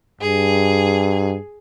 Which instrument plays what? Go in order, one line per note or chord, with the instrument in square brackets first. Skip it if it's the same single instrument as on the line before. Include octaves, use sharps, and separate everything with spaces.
[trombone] G2 [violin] G#4